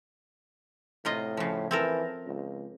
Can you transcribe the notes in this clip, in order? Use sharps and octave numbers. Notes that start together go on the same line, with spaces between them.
A2 C3 F4 D#5
C#3 F3
E3 C4 A4 A#4
C#2